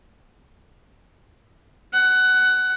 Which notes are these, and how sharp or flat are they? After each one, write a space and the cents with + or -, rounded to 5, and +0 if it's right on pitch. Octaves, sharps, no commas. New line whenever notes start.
F#5 +15